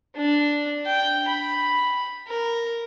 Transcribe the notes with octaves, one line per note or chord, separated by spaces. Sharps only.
D4
G5
B5
A#4